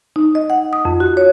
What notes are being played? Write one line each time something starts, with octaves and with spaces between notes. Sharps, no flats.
D#4
D#5
F#5
D#6
F2
F#4
C#5